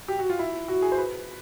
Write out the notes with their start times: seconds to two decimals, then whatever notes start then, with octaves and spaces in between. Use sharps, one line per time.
0.08 G4
0.19 F#4
0.30 F4
0.39 E4
0.68 F#4
0.82 G#4
0.92 C5
0.98 B4